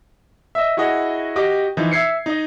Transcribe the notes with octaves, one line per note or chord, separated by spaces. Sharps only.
D#5 E5
E4 F#4 G#4 D#5 F#5
F#4 G4 D#5 G5 D6
E3 F3 D#4
E5 G#6 C7 C#7
D#4 D#5